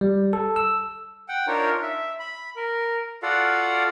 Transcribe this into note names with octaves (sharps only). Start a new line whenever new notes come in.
G3
A4
E6
F#5 G5
D4 D#4 F4 A#4 C#5
E5
B5
A#4
F4 F#4 A4 D5 F5 F#5